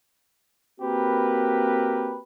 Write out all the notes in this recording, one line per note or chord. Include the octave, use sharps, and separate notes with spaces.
A#3 C4 F#4 G4 A#4 B4